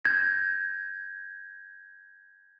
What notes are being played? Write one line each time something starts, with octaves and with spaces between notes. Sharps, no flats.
G6 G#6 A#6